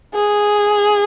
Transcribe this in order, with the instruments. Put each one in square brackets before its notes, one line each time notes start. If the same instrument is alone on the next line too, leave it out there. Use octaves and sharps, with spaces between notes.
[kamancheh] G#4